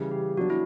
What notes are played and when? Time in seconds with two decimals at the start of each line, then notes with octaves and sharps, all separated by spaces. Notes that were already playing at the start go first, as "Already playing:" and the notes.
Already playing: C#3 E3 G3
0.11 G4
0.37 F#3 B3 D4 F#4
0.50 E4